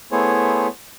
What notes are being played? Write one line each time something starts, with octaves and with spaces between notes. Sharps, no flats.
A3 B3 E4 G#4 C5 C#5